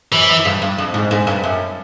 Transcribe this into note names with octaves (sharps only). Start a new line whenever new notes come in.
F#2 E3
F#2
G2
G2
F2
G#2
G#2
G2
F#2